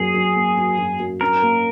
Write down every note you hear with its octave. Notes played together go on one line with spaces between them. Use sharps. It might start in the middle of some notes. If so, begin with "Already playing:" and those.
Already playing: F#2 F#3 A#3 G#4
F#2
A#3
F#3
F#2
F#2
C#4 A#4
A#3